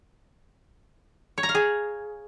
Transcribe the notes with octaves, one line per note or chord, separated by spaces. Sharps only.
C#5
A#5
F5
G#4